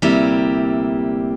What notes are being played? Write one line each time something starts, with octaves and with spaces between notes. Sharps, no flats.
D2 C3 G3 A#3 E4